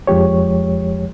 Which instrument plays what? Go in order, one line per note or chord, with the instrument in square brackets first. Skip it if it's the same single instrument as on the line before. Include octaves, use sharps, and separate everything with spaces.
[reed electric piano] F2 F3 G#3 G4 C#5